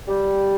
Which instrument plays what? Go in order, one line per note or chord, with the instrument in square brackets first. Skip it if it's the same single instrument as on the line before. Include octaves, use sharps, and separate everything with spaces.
[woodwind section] G3